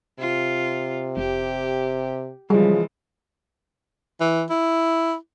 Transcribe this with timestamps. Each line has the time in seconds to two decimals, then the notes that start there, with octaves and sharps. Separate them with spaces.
0.19 C3 F4
1.17 F1 G4
2.50 C#3 E3 F3 G3 G#3
4.20 E3
4.50 E4